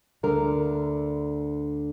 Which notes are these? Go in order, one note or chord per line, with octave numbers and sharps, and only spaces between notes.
D2 D3 A#4